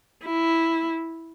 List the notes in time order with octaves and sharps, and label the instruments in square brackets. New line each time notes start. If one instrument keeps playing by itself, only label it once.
[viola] E4